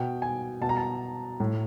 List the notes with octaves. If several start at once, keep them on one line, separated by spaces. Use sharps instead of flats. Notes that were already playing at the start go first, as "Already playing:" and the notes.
Already playing: B2 G5
G#5
B2 A5
A#5
A5
A2